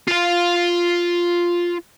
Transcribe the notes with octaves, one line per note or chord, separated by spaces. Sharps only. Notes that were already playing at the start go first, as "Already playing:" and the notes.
F4 F5